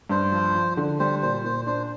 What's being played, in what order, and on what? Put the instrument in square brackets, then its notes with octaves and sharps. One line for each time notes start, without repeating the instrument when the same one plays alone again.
[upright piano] G2 [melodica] C5
[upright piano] F3
F3
D3
[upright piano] G3 [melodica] C5
[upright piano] A#2 [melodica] C5
[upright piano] A#2 [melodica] C5
[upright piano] D4 [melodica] C5